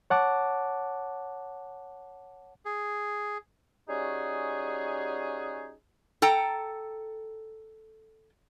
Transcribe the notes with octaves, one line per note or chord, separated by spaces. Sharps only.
C#5 F#5 A5 D6
G#4
G3 C#4 D#4 F#4 G#4
A4 G5 A#5